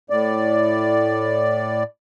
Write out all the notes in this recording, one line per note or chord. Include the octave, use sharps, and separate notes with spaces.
A2 D5